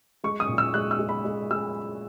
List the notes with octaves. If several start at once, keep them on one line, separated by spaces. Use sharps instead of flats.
G#3 C#6
D#6
A#2
E6
G#3 F#6
E6
G#3
B5
G#3
G#3 E6